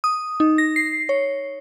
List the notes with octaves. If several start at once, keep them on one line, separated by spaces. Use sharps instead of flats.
D#6
D#4
A#6
C7
C#5